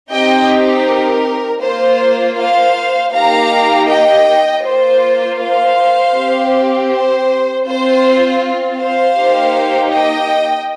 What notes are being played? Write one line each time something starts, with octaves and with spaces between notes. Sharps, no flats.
C4 D#4 G4 D#5 G5
A#4
A#3 F4 C5
C5 F5
A#3 D#4 G4 F5 A#5
D#5 G5
A#3 F4 C5
C5 F5
C4 G4
C5
C4 F4 C5
C5 F5
A#3 D#4 G4
D#5 G5